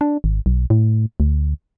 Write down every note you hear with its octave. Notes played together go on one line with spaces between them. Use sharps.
D4
G#1
B1
A2
D2